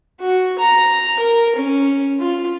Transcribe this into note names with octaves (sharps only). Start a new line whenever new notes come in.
F#4
A#5
A#4
C#4
F4